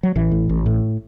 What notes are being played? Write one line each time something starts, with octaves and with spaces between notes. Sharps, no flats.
F#3
A1 E3
A2
A1
A2